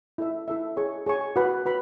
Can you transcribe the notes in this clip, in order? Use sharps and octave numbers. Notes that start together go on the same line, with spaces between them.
E4 A4 E5
E4 A4 E5
G#4 C#5 G#5 C#6
G#4 C#5 G#5 C#6
F#4 B4 F#5 B5
F#4 B4 B5